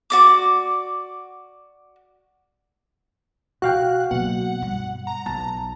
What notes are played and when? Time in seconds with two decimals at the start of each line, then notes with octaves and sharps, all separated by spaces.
0.10 F#4 D5 D6
3.62 B2 F#4 F5 G5 F#6
4.11 B2 F#3 A#3 F#5
4.62 G2 G3
5.07 A#5
5.26 B1 A5